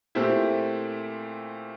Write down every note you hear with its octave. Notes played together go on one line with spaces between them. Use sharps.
A#2 A3 C4 E4 G4